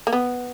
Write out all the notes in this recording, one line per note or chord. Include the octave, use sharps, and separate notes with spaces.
A#3
B3